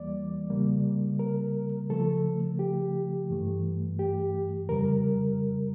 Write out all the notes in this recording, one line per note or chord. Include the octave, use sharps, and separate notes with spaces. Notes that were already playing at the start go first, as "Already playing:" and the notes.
Already playing: E2 E3 G3 A#3 D5
C#3 G3 A#3
A#4
C#3 F3 A3 A4
G4
G2 E3 A3
G4
F2 C#3 G3 A#4